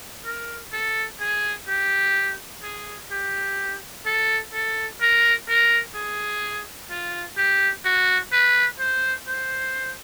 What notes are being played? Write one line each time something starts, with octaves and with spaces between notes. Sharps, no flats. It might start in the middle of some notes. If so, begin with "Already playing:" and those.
A#4
A4
G#4
G4
G#4
G4
A4
A4
A#4
A#4
G#4
F4
G4
F#4
B4
C5
C5